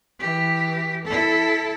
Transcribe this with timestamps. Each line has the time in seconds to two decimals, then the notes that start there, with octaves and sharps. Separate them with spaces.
0.19 E3 G4
1.05 E4 A4